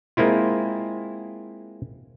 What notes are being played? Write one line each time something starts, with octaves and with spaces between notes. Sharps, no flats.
G#3 A#3 C4 E4 F4